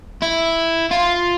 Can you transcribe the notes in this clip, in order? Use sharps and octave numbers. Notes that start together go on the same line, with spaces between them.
E4
F4